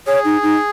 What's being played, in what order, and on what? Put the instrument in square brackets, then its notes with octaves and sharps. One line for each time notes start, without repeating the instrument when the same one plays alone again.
[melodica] G#4 [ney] C#5
[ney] D#4
D#4